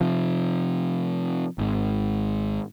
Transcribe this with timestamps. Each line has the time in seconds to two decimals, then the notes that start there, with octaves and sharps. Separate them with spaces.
0.01 C3 F3
1.58 G#1 G#2